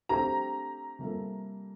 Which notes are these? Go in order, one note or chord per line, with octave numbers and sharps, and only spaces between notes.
D3 A3 C4 G4 A#5
C3 G3 A#3 F4 A4